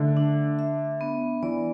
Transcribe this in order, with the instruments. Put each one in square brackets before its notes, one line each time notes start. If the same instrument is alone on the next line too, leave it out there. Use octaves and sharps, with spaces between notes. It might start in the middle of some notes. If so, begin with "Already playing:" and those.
Already playing: [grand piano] D3 [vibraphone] A3 E5
[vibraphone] D4
E5
B3
[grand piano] E3 [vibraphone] D5